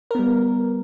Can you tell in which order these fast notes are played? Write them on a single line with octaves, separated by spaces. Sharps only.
A#4 B3 G3